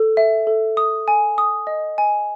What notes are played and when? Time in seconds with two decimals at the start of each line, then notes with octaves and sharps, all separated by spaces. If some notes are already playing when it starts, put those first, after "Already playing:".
Already playing: A4
0.17 E5
0.47 A4
0.77 D#6
1.08 G#5
1.38 D#6
1.67 D#5
1.98 G#5